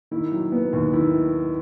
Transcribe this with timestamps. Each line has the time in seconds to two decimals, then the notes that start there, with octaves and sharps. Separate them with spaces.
0.11 D#3 E4
0.32 F#3
0.52 B3
0.73 D#2
0.93 D#3 E4